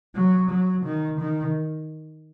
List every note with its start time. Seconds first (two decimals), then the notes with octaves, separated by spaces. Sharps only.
0.15 F#3
0.50 F#3
0.85 D#3
1.20 D#3